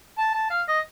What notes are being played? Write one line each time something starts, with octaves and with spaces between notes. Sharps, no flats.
A5
A5
F5
D#5